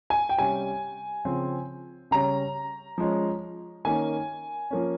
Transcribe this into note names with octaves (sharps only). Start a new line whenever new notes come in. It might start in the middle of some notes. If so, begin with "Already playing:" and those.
G#5
G5
C3 G3 C#4 G#5
C#3 F3 C4
C#3 G3 C#4 A#5
F3 G#3 C#4
D#3 A#3 C#4 G#5
F3 A#3 C#4